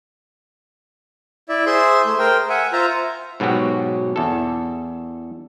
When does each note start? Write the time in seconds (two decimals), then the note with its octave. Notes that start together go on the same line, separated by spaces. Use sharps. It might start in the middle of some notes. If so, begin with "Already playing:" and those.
1.49 E4 D5 E5
1.66 G#4 C5 E5 C6
2.05 A3
2.19 A#4 C5 G5
2.49 E5 F#5 G#5
2.73 F4 C5 E5 A#5
3.40 G#2 B2 F#3 F#4 G4
4.16 E2 A4